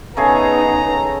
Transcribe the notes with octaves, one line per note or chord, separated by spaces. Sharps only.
C#3 A3 B3 D#4 G#4 A#5